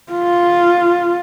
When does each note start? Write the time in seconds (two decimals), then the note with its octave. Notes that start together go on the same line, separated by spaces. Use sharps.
0.13 F4